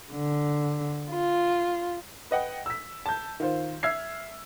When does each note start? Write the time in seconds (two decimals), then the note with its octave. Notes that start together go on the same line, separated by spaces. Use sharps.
0.11 D3
1.10 F4
2.31 B4 D#5 F#5 G5
2.66 E6 B6
3.06 A5 G6
3.40 D#3 F4 C5
3.83 E5 E6 F6 G#6 C7